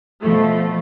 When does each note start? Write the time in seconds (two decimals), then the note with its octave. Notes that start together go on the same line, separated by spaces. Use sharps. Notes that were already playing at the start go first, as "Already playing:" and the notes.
0.22 B2 F3 A3